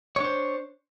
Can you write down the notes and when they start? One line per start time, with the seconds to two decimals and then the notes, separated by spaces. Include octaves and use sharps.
0.16 C#5
0.20 D4
0.24 C5